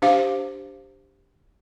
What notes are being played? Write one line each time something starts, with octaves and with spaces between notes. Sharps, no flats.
D4 G4 C5 F5